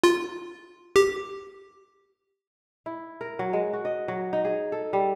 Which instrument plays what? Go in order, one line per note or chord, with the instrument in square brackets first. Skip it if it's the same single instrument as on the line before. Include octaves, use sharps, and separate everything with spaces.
[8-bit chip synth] F4
G4
[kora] E4
A#4
F#3
G#3
F#4
D#5
F#3
D#4
G#4
A4
G3